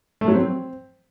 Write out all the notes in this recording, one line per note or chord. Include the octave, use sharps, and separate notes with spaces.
A3
F#3
C4